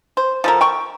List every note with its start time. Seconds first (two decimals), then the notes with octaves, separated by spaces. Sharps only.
0.17 C5
0.44 F3 A4 A#4
0.61 G5 C#6